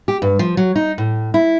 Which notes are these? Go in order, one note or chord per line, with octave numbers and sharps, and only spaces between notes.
G4
G2
F3
F#3
D#4
A2
E4